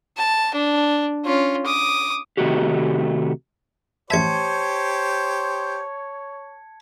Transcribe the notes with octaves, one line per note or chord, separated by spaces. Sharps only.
A5
D4
C#4 F4
D6 D#6
C3 D#3 A3 D#4 F#4 G4
A1 G4 C5 C#5 E5 A5 G#6 C#7